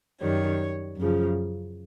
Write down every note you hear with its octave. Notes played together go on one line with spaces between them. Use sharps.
F#2 D#3 G3 C#5
F#2 C#3 F3